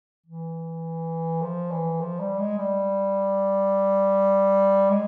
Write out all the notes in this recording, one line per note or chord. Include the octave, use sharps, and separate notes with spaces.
E3
F3
E3
F3
G3
G#3
G3
G#3